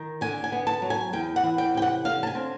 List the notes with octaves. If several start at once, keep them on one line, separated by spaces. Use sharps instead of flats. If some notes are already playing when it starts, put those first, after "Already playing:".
Already playing: D#3
D3 G#5
G#5
B3
A5
F#3
G#5
E2 G5
F#5
E3
G5
C3 G5
F#5
D3 F5
A5
G#5
C4